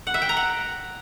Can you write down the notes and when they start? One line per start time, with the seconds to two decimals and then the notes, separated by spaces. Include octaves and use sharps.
0.07 F#5
0.14 E5
0.22 G5
0.29 A#5
0.37 F#5